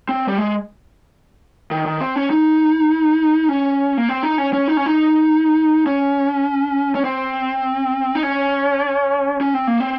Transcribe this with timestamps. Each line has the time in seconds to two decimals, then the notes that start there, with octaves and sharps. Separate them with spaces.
0.09 C4
0.28 G3
0.38 G#3
1.71 D#3
1.86 D#3
2.01 C4
2.16 C#4
2.30 D#4
3.49 C#4
3.97 A#3
4.09 C4
4.23 D#4
4.38 C#4
4.53 C#4
4.68 D#4
4.77 C#4
4.86 D#4
5.86 C#4
6.95 C#4
7.04 C4
8.15 D#4
8.23 C#4
9.41 C#4
9.54 C4
9.67 A#3
9.80 C4